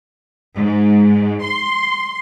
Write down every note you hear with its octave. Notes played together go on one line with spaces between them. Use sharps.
G#2
C6